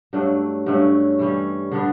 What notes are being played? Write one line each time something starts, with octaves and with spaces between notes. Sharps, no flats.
G2 F#3 A3 D4
G2 F#3 A3 C#4
E3 G3 C#4
D3 G3 B3 D4